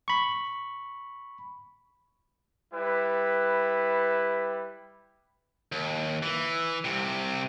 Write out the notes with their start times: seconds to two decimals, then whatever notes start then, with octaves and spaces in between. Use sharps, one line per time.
0.08 B5 C#6
2.73 G3 E4 B4
5.72 D#2
6.23 E3
6.85 C2 C3